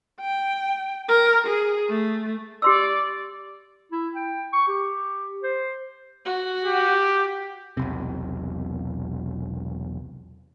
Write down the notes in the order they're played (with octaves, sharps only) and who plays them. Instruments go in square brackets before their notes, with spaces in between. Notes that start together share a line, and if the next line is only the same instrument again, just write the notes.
[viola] G5
A#4
G#4
A3
[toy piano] G4 C6 E6 [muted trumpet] D5
[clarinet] E4
G5
C#6
G4
C5
[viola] F#4
[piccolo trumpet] G4
[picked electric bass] E1 B1 C3